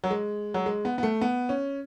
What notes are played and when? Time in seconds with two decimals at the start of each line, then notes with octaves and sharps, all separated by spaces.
0.04 F#3
0.11 G#3
0.54 F#3
0.66 G#3
0.85 B3
0.98 B3
1.03 A3
1.21 B3
1.49 C#4